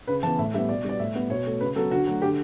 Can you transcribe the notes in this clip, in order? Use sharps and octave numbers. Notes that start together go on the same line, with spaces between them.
C#3 B4
E3 B3 A5
A2 E5
G3 B3 E5
B2 D5
G3 B3 D5
A2 E5
G3 B3
B2 C#5
A3
C#3 B4
F#3 B3 A4
D3 F#4
F#3 A3
D3 G4